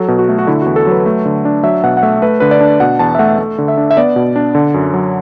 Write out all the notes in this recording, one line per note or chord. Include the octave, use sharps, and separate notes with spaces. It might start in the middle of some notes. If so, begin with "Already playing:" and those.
Already playing: F#3 A4
B2
F#4
A3
F#4
D3 E4
E2 F#4
A4
F#3 B4
A3
D3
D4
F#3 E5
B2 F#5
F#5
A3 E5
A3 B4
D3 B4
D5
D4
B2 F#5
E2 A5
E5
A3 F#5
A3
D3
E5
D4
E5
B3 D5
B2
D4
D3
F#2
F#3